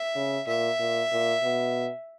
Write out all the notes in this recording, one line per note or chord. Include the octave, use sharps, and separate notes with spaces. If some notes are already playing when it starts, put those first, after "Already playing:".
Already playing: E5
C#3
A#2 E5
A#2
A#2
B2